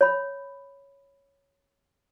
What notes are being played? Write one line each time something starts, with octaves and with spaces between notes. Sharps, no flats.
C#5 B5